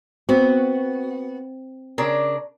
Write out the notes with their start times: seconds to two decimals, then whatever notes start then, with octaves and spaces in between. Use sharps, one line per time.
0.29 B3 C4 F#4
1.98 C#3 D4 A#4